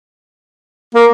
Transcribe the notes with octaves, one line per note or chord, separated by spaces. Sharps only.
A#3